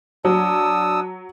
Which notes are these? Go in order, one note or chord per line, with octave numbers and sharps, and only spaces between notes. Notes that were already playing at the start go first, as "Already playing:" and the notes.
F#3 D4 D#6 E6